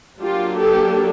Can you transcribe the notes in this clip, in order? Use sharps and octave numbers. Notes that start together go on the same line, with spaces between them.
F#3 A#3 D4 F4 G4
G4 A4